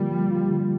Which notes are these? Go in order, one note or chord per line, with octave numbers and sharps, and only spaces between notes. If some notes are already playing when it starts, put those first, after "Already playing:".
Already playing: D3 F3 G3 A#3 F4
F3
F4
D3